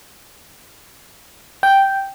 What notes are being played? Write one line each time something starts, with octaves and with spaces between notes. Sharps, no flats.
G5